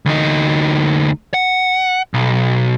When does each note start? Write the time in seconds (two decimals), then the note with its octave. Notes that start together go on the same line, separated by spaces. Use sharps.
0.05 D2 D#4
1.34 F#5
2.14 B1